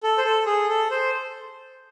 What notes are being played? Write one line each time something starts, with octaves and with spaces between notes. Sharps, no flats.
A4
C5
A4
G#4
A4
C5